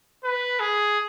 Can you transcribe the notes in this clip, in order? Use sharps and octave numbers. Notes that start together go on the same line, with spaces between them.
B4
G#4